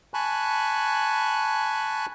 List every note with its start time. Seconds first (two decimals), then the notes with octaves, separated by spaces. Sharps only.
0.14 G#5 A5 B5 C#6 F#6